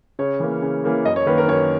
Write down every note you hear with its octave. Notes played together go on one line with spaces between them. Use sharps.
C#3 C#5
E3 A#3 C#4
C#3
E3 A#3 C#4
F#2 D#5
C#5
D#3 A#3 B4
A#4
F#2 C#5